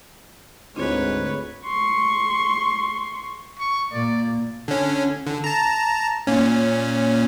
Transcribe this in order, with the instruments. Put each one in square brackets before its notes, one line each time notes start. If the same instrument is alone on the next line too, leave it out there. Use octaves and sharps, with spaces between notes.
[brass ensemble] D2 G#2 [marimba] C4 D4 F4 [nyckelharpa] B4 C#5
[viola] C6 C#6
[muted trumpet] C#6
[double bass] A#2 A#3 [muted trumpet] D5
[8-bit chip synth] D3 C#4
D3
A5 A#5
A#2 C#4